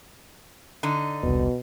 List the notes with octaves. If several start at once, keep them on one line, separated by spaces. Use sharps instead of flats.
D3 D#4
E1 C2 B2